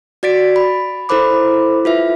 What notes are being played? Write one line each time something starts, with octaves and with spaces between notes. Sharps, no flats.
F#4 D5 A6 B6 D7
B5
E4 A4 A#4 C5 B5 D6
F4 B4 E5